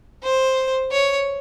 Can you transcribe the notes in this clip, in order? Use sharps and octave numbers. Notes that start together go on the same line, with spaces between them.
C5
C#5